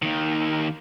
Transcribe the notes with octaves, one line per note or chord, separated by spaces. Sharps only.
D#2 D#3